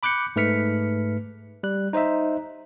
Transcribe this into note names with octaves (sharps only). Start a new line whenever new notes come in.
B5 D6 F#6 G6 C#7
G#2 A3 B4 F6 B6 C#7
G3 F#6
D#4 C5 D#5 E5